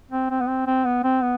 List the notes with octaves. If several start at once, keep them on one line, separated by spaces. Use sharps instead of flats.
C4
C4
B3
C4
C4
B3
C4
B3